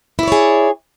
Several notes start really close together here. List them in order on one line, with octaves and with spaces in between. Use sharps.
E4 D5 C#5 G#4